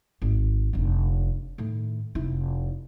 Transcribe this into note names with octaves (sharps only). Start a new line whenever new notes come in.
G#1
F1 D3
A2 D#3
F1 E4